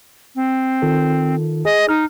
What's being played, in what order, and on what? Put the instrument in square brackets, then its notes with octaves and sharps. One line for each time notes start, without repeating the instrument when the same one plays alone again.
[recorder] C4
[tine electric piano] D#3 F4 A4
[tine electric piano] G#4 [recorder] D#5
[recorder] D#4 [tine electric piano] F6